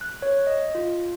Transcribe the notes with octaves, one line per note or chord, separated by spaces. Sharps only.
F#6
C#5
D#5
F4